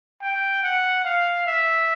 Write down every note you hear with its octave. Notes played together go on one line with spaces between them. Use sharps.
G5
F#5
F5
E5